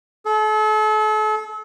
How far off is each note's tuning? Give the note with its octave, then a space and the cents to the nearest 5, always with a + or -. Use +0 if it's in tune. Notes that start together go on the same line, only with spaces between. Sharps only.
A4 -40